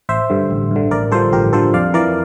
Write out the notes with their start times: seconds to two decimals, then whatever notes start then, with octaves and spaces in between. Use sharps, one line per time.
0.09 A1 C5 E5
0.30 G2 D3
0.51 A1
0.71 G2
0.76 D3
0.91 A1 A#4 D5
1.11 G2 D3 F3 A4 C5
1.33 A1 G4 A#4
1.53 G2 D3 F3 A4 C5
1.74 F2 D5 F5
1.94 E3 A#4 D5